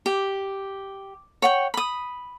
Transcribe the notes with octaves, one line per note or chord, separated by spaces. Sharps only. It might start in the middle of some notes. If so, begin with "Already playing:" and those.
G4
C#5 F#5 G5
B5 D#6